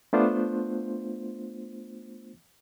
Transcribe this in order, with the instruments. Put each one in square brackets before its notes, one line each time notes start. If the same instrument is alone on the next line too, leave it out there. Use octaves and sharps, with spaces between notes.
[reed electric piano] A3 B3 D4 F4 C5